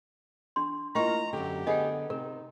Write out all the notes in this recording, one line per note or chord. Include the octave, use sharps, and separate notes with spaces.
D4 C6
A#3 E4 F4 D#5 G5 A#5 C#6
F#2 D3 G4
D3 B3 G#4 D#5 F#5 G5
C3 D#4 A#4